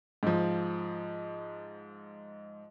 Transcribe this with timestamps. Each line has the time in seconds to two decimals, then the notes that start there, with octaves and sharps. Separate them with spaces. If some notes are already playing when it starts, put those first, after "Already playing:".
0.23 G#2 F3